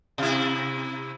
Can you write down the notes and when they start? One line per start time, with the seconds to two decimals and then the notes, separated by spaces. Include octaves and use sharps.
0.18 C3 E4